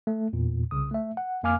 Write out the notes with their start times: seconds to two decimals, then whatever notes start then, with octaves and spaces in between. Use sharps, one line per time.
0.07 A3
0.33 E2 A#2
0.71 C2 C#3 D#6
0.91 A3 E5
1.17 F#5
1.43 F2 A#3 F5 G#5 D6 F6